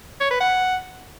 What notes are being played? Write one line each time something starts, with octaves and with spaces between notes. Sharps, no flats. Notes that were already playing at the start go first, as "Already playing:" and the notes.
C#5
B4
F#5